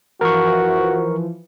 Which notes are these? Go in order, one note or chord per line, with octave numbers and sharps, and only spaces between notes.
E3 F3 F#4 A#4 C#6